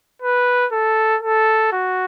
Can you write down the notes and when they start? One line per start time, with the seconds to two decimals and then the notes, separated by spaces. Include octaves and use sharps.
0.22 B4
0.72 A4
1.22 A4
1.72 F#4